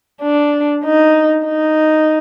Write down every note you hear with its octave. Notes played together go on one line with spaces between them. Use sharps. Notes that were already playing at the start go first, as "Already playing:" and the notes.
D4
D#4
D#4